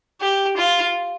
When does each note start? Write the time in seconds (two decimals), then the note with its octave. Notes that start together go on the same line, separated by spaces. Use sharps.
0.21 G4
0.57 F4